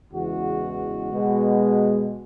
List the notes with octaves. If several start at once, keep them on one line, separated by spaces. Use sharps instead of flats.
E2 C#3 E3 G#3 F#4
B2 G#3 B3